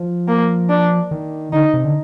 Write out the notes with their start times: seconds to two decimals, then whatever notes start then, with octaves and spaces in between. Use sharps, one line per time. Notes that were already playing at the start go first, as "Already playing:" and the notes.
Already playing: F3
0.28 A#3
0.69 D4
1.11 D#3
1.52 D3 D#4
1.74 C3
1.85 D3